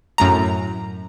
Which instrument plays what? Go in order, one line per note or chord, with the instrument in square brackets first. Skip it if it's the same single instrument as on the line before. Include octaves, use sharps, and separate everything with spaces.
[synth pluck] F#2 A2 A#5